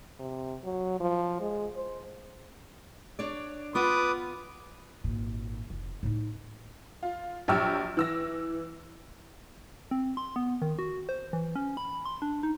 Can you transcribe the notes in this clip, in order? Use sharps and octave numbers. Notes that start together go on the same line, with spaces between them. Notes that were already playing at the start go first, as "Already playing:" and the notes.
C3
F#3
F3
G#3
C5
D4 C#5 D5
B3 F4 B4 D6 D#6
G#1 A#2
F1
A2 D#4
F4
A#1 F#3 G4 C#6 E6 F6
E3 E6 A#6
C4
C6
B3
D#3
F#4
C5
E3
C#4
B5
C6
D4
D#4